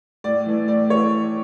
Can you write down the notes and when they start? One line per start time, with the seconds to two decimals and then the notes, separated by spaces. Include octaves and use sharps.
0.24 A2 D5
0.46 E3 A3
0.68 A2 D5
0.90 E3 C#5